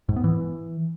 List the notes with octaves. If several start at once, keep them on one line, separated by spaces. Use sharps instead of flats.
G#2
B3
E3